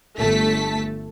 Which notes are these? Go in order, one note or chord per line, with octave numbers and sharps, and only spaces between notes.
G1 A3 A4 A5 B6